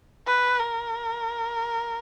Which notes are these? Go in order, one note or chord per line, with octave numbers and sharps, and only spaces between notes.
B4
A#4